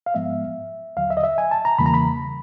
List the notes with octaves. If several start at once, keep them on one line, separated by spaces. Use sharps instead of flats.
F5
G#2 F3 G#3 B3 E5
D#2 D3 F#3 F5
E5
D#5
E5
G#5
A5
A#5
E2 C#3 E3 G3 A#3 B5
A#5
B5